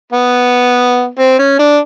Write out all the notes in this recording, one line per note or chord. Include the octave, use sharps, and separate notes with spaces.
B3
C4
C#4
D4